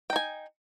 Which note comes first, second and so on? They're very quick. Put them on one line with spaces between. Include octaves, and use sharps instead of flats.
G5 D#4 G#5